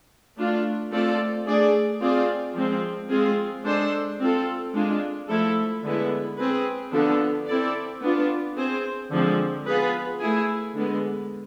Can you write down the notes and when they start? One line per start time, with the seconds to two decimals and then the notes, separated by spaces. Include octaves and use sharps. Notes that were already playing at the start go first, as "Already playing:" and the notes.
0.37 A3 D4 F4
0.91 A3 C4 F4 A4 D5
1.46 A3 D4 G#4 D5
2.01 C4 F4 G#4 D5
2.55 F3 G#3 C4
3.10 G#3 C4 F4 G#4
3.65 G#3 D4 A4 C5
4.19 C4 F4 A4
4.74 G#3 D4 F4
5.28 F3 A3 E4 A4
5.83 D3 G#3 B3 E4
6.38 C4 G#4 B4
6.92 D3 F3 B3 D4 A4
7.47 C4 E4 A4 D5
8.02 B3 D4 F4
8.56 C4 G#4 C5
9.11 D3 F3 G#3 C4
9.66 B3 F4 G#4 B4
10.20 A3 E4 G#4
10.74 D3 G#3 B3